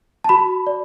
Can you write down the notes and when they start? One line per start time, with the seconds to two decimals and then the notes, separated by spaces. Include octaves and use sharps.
0.24 A5
0.29 F#4 B5
0.67 D5